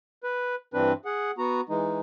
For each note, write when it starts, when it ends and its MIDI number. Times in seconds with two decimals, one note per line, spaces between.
0.24 0.55 71
0.74 0.93 43
0.74 0.93 52
0.74 0.93 60
0.74 0.93 62
0.74 0.93 71
1.05 1.31 68
1.05 1.31 78
1.38 1.61 59
1.38 1.61 66
1.38 1.61 82
1.69 2.01 52
1.69 2.01 56
1.69 2.01 63